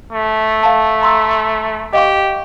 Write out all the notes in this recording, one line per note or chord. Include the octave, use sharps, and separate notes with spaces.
A3
F5 A5
A#5 C6 E6
G4 D#5 F5 C#6